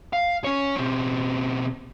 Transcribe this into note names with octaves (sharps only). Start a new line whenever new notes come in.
F5
C#4 C#5
B2 C4